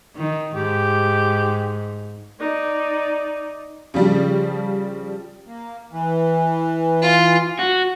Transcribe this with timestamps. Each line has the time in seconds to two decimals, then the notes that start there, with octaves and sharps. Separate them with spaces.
0.16 D#3
0.55 G#2 G4
2.40 D#4 D5
3.94 C#3 F3 G3
5.47 A#3
5.92 E3
7.02 F4
7.59 F#4